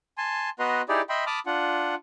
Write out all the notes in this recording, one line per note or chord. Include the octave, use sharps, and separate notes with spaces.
G#5 A5 C6
B3 F#4 B4 D#5 A#5 C6
D#4 E4 G4 G#4 D5
D#5 E5 G5 B5 C6
A5 B5 D6 D#6 F6
D4 F4 F#5